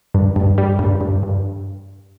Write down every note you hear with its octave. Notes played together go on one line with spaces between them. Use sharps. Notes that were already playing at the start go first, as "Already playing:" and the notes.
G2
G2
G3
G2
G2
G2